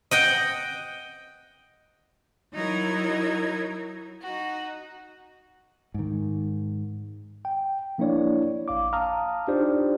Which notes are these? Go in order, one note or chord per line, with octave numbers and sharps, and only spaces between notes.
D#5 F#5 G5
F#3 D#4 E4 A#4 G#6
D#4 F#4
G#2 D#3
G5
F3 A#3 D4 E4 C#5 D5
A1 F5 D6
F5 A5 A#5 D#6 F6
D4 D#4 F4 G4 C5 D5